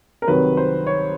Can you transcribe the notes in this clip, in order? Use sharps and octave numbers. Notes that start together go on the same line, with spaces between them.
A#4
C2 C3 D#3 F#3 B4
C5
C#5